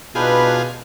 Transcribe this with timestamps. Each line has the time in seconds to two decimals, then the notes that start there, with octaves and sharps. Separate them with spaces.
0.15 B2 D4 D#4 F4 G#4 B4 G5